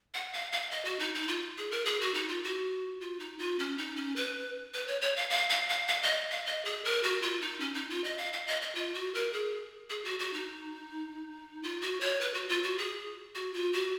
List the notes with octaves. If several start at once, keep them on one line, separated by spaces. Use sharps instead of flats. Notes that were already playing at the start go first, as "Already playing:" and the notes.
F#5
F5
F5
D#5
F#4
D#4
D#4
F4
G#4
A#4
G#4
F#4
D#4
F4
F#4
F4
D#4
F4
C#4
D#4
C#4
B4
B4
C#5
C#5
F5
F5
F5
F5
F5
D#5
F5
D#5
G#4
A#4
F#4
F4
D#4
C#4
D#4
F4
D#5
F5
F5
D#5
D#5
F4
F#4
A#4
G#4
G#4
F#4
F#4
D#4
F4
F#4
C#5
B4
F#4
F4
F#4
G#4
F#4
F4
F#4